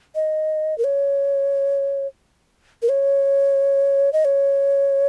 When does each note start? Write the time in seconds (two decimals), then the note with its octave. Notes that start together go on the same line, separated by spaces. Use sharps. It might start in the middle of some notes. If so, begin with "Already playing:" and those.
0.15 D#5
0.78 A#4
0.84 C#5
2.82 A#4
2.89 C#5
4.13 D#5
4.25 C#5